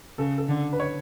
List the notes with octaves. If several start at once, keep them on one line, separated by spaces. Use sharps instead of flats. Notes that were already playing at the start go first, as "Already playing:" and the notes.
C#3 A4
A4
D3
B4
C#5